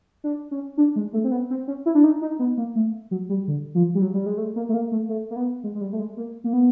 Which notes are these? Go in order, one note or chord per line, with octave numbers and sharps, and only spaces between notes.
D4
C#4
D4
G#3
A3
C4
B3
C4
C#4
E4
D4
D#4
D#4
B3
A#3
A3
F#3
G3
D3
F3
G3
F#3
G3
G#3
A3
A#3
A3
A#3
A3
A3
A#3
B3
G#3
G#3
G3
A3
G#3
A#3
A#3
B3